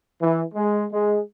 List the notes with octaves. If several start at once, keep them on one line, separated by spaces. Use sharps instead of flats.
E3
G#3
G#3